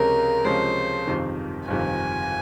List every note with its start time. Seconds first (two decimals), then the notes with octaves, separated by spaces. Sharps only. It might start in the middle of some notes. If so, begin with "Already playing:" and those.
Already playing: C#2 C3 F3 G#3 C#4 A#4
0.45 C#2 C3 F3 G#3 C#4 C5
1.07 G1 F2 C3 D#3
1.68 G1 F2 C3 D#3 G#5